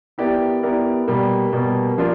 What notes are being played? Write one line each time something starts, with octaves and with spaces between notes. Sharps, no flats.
B3 E4 G4 A#4 D5
B3 E4 G4 A#4 D5
B2 G3 A#3
B2 G3 A#3
F3 A#3 D4 F4 A#4